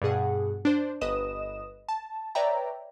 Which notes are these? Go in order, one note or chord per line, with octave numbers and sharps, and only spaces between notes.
G2 B2 G#4 F#5
D4 C5
G1 B4 D#5 D#6 E7
A5
B4 C#5 D5 E5 G5 A#5